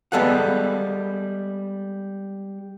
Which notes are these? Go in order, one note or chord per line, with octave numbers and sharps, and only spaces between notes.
G3 G#3 B3 A4 F5 F#5